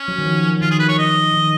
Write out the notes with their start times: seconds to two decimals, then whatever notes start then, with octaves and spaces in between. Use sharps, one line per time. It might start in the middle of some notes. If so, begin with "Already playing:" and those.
Already playing: C#4
0.08 F#3
0.18 D#3
0.26 F3
0.62 D#3 F4
0.71 G#4
0.79 B4
0.89 C#5
0.98 D#5
1.34 D#3